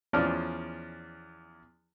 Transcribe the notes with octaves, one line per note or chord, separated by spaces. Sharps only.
E2 F3 C#4 D5 F6